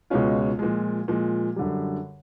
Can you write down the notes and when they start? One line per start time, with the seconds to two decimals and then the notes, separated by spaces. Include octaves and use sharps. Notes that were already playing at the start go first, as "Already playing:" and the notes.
0.10 C#2 B2 G#3 C#4 F4
0.59 A#2 F3 G#3
1.08 A#2 F3 G#3
1.56 F#2 D3 G3